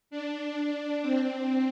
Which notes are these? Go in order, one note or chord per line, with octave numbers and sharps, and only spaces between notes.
D4
D4
C4